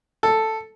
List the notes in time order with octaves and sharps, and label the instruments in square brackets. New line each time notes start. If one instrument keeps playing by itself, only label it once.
[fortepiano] A4